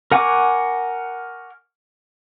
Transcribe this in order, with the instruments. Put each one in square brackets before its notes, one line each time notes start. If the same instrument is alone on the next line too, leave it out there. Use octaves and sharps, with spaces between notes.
[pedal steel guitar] A#4 F#5 G#5 C#6 D6